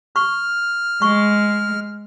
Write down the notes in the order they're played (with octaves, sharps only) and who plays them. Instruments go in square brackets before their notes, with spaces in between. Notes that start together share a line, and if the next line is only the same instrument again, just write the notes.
[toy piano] C#6 [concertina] F6
[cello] G#3 [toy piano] C#6